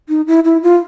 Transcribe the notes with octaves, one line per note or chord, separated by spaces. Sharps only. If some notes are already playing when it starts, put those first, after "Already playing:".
D#4
E4
E4
F4